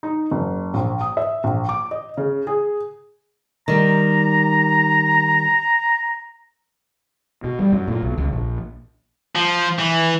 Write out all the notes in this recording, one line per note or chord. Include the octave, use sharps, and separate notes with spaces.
D#4
F#1
A#1
D#6
E5
A#1
D6
D#5
C#3
G#4
D#3 G3 A#5
B2
G3
F#2
A#2
B1
C#2
A#1
F3
E3